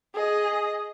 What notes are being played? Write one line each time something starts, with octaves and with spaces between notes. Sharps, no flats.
G#4 D#5